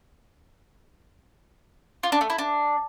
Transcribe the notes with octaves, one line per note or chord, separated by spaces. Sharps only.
F4
D4
A3
E4
D4